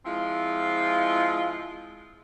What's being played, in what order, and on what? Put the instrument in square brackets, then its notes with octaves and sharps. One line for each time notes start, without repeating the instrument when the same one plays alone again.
[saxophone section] F3 G#3 C4 E4 F4